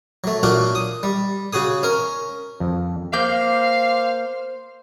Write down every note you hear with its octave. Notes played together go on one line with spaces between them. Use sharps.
F#3 A3
A#2 F#3 D4 F4 F#4
D#6
G3
C#3 F#4 G#4 D#6
C#4 A#4
F2
A#3 C5 F5 G6